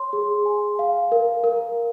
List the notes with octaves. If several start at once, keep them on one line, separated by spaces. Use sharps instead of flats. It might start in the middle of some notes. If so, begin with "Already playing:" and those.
Already playing: C#5 C6
G#4
G#5
F5
A#4
A#4